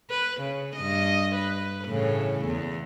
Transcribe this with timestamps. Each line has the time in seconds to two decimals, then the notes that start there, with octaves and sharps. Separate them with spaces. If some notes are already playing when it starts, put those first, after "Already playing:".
0.11 B4
0.41 C#3
0.76 G2 D#5
1.36 B4
1.86 A2 C#3 E3
2.46 E2